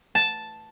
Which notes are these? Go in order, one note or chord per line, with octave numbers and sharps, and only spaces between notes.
A5